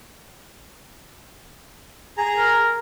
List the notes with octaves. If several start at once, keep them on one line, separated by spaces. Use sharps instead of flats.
G#4 A#5
A#4